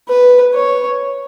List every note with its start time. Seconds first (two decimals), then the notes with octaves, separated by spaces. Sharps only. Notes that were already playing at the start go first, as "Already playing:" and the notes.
0.09 B4
0.54 C#5